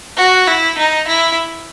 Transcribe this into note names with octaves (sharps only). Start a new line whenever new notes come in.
F#4
E4
D#4
E4